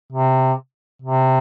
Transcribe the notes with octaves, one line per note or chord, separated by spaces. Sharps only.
C3
C3